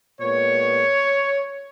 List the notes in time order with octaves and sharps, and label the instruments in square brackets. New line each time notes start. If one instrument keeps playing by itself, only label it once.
[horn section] A#2 G#3 B3 C#5